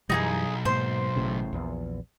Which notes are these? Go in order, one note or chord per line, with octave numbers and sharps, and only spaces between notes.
B1 F#2 E3 G3 D#4 F#4 G#4
G#2 A#3 C5 C6
A1 A2 C#3
A#1 E2